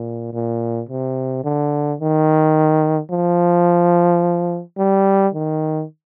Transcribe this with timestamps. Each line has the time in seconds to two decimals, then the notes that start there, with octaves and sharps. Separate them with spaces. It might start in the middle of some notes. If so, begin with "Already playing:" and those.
Already playing: A#2
0.33 A#2
0.89 C3
1.44 D3
2.01 D#3
3.11 F3
4.78 G3
5.34 D#3